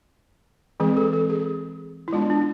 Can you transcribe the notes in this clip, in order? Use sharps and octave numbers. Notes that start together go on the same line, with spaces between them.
E3 G#3 C4 G#4
A4
A4
G#4
E4
G#3 B3 D4 F4
D4